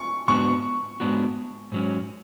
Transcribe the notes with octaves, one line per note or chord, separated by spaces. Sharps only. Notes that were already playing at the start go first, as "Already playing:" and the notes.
Already playing: C#6
G#2 G#3 B3 D4 F#4 C#6
G#2 G#3 B3 D4 F#4
G#2 F#3 C#4